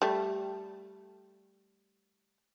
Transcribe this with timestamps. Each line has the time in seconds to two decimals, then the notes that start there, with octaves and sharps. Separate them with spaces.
0.02 G3 A3